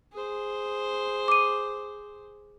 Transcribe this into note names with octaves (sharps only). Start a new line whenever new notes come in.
G#4 C5
D6 D#7